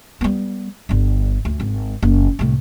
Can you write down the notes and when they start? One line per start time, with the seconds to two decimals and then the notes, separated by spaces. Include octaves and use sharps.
0.21 G3 B3
0.89 G1 D3
1.45 D2
1.60 G#1
2.03 F#1
2.39 C2 A2